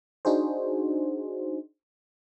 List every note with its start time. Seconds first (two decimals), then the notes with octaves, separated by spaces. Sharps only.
0.25 D4 D#4 F#4 G#4 C5